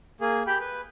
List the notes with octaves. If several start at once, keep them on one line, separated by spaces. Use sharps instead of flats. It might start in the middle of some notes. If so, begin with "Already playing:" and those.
A#3 G#4
G4 G5 B5
B4